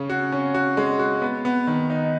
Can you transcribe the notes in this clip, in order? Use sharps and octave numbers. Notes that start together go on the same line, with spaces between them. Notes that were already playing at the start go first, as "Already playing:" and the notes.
Already playing: C#3 C#4
F#4
C#4
F#4
G#3
F#4
B3
B3
D#3
D#4